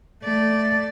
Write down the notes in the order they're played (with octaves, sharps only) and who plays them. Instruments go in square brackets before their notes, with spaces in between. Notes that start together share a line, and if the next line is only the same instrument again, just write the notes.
[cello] A3 D5